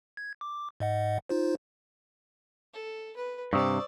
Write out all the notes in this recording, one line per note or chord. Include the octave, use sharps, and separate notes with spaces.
G#6
D6
G#2 D#5 F#5
D#4 F4 C5
A4
B4
G2 C3 C5 D5 C#6 D#6 E6